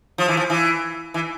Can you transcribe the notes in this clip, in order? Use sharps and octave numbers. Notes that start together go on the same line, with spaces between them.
F3
E3
F3
E3
E3